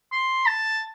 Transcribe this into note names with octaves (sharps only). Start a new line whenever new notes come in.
C6
A5